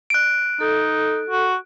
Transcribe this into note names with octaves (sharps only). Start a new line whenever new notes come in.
F#6 D7
D#4 A4
F#4